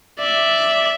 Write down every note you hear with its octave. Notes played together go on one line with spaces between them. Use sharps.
D5 E5